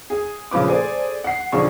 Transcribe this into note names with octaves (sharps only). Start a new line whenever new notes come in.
G#4
A#2 C#3 F3 B4 D6
G#4 A4 C5 D5 G#5
F#5 C7
B1 D3 F3 D4 G#4 C#6